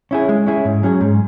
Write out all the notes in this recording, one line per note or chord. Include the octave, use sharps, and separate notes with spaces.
C#4 E4 G#4
G#3
C#4 E4 G#4
G#2
F#3 C#4 G#4
G#2